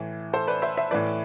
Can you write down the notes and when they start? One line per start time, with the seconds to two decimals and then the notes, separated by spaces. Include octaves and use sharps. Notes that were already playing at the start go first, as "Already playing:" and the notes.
Already playing: A2 E3
0.33 A4 C5
0.47 B4 D5
0.62 C5 E5
0.77 C5 E5
0.91 A2 E3 B4 D5